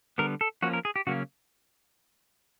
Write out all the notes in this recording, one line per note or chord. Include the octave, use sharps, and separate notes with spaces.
D3 G3 B3 A#4
A4
F3 A#3 C#4 F#4
A#4
G#4
G4
C#3 F#3 A#3 C#4 F#4